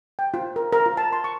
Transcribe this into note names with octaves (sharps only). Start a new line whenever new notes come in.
G5
F4
A#4
A#4
F4
A5
C6
C#6